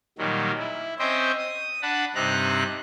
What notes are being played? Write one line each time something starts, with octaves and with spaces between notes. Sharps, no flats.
A#2 D#3 F#3 G3
E4
C4 C#4 C5 D#5 E5 G5
D#6
D4 F#5 A5 B5
G2 C3 C4 D#4 A#5 F#6